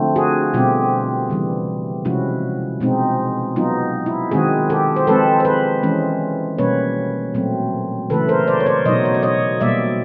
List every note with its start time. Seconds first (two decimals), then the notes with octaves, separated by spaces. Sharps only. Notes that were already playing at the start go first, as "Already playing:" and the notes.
Already playing: D3 F3 A3 C4
0.16 F#4 G#4
0.54 B2 G3 C4 F4 G4
1.30 C#3 E3 G3
2.05 C3 F3 G#3 C#4 E4 F#4
2.81 B2 G#3 C4 D#4
3.56 F#3 B3 D#4 F4
4.06 E4
4.31 D#3 G#3 C4 F#4 G#4
4.70 G4 A4
4.96 C5
5.07 F3 G#3 C4 A4 B4
5.40 C5
5.45 A4 B4
5.83 E3 G#3 C#4
6.58 B2 G3 A#3 C#4 B4 C#5
7.34 A#2 F#3 A3 C4
8.10 C#3 E3 A3 A4 B4
8.29 A#4 C5
8.48 C5 D5
8.60 C#5
8.66 C5 D5
8.85 B2 F#3 B3 D#4 C#5 D#5
9.05 C#5
9.14 D5
9.23 C#5 D#5
9.61 B2 G3 A#3 D5 E5